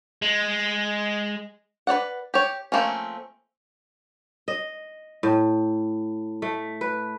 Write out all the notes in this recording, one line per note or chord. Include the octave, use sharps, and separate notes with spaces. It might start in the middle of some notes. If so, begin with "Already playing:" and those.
G#3
B4 C#5 D5 F#5
G4 C#5
F3 A3 A#3 C4 C#4
D#5
A2
A3
B4